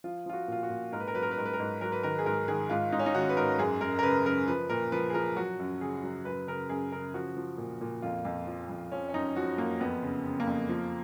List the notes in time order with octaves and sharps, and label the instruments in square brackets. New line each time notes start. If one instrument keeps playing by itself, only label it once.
[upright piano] F3 F4
F3 F4
F#4
A#2 F4
F#4
A#2
G#2 A#4
B4
A#4
F#3 B4
A#4
B4
G#2 A#4
B4
A#4
G#2
F#3 A#4
B4
D#3 A#4
G#4
G#2 A#4
D#3 G#4
G#2 F4
G#2 D#4
C#4
D#4
D#3 F#4
B4
G#2 A#4
F#2 G#4
F#2 A#4
A#4
C#3 B4
F#2 A#4
F3 B4
A#2 A#4
F3 B4
G#4
F3 A#4
F#3 F#4
F#2
C#3 G#4
F#3
F#2 B4
C#3 A#4
F#2 G#4
C#3 A#4
F3 F#4
F3
A#2
A#2
F2 F4
F2
F3
F2
F3 C#4
C#4
F#2 D#4
F3 F#4
F#2 A#3
F2 B3
C#3
C#3
A#3
F2
F3